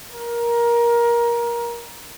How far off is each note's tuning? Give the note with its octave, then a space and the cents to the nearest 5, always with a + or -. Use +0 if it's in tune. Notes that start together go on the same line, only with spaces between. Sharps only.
A#4 +20